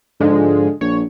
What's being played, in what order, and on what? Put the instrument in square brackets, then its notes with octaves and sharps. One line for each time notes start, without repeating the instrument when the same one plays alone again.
[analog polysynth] G#2 F3 G#3 [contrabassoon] D3
[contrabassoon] A#1 [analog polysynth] C#5